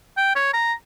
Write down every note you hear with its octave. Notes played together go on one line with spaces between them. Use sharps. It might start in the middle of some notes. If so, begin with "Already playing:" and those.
G5
C#5
A#5